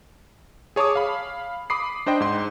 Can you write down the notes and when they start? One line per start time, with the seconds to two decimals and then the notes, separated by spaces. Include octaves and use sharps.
0.76 G#4 C#5 A5 D6 D#6
0.95 F5 B5
1.70 B5 D6 D#6 C7
2.06 D4 C5 D#5 G5
2.20 G#2 C6